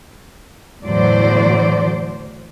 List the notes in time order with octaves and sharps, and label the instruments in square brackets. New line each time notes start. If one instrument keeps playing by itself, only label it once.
[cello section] E2 A2 D3 F#3 C5 D5